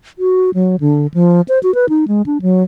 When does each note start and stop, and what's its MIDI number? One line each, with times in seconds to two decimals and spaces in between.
0.19 0.50 66
0.54 0.76 54
0.80 1.07 50
1.14 1.41 53
1.48 1.59 72
1.63 1.74 66
1.75 1.89 71
1.89 2.05 63
2.08 2.22 56
2.26 2.42 62
2.42 2.63 54